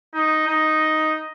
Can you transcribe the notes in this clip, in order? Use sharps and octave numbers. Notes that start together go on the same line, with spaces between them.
D#4
D#4